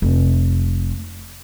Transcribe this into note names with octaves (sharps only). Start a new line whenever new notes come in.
F1